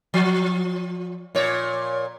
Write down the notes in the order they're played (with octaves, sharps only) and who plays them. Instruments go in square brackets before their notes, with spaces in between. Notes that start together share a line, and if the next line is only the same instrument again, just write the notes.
[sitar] F3
A#2 C#5